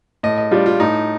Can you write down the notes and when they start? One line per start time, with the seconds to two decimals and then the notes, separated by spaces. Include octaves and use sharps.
0.23 A2 D#5
0.38 D#5
0.51 G3 D4 F4
0.66 F4
0.80 A2 D#4